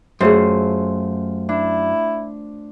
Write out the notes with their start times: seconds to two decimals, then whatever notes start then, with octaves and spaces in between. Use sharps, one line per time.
0.21 F#2 A3 F4 G#4 A#4 C5 E5
1.49 D4 E4